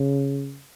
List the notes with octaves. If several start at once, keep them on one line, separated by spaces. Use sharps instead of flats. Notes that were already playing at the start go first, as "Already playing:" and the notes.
Already playing: C#3